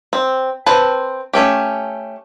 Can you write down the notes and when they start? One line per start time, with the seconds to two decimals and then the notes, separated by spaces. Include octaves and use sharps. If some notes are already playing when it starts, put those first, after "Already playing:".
0.13 C4
0.66 C4 B4 C5 A5
1.33 A3 C#4 G4